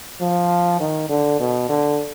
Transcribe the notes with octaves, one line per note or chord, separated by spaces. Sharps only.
F3
D#3
D3
B2
D3